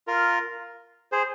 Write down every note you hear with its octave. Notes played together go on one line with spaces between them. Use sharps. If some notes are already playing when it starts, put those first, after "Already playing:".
F4 A#4
G#4 C5